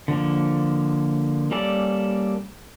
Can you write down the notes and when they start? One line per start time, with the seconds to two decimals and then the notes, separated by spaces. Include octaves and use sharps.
0.08 D3 F3 A#3
1.51 G3 A#3 C#4 A4 D5